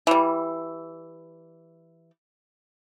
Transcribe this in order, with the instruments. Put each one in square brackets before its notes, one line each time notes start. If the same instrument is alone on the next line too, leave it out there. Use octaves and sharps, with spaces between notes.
[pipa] E3 G3